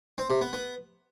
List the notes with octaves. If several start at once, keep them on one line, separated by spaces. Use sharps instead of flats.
C4
C3
B3
B3